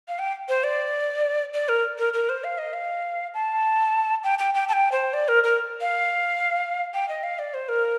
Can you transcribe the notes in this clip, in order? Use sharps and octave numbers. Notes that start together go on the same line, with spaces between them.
F5
G5
C5
D5
D5
A#4
A#4
A#4
C5
F5
D#5
F5
A5
G5
G5
G5
A5
G5
C5
D5
A#4
A#4
F5
G5
D#5
F5
D5
C5
A#4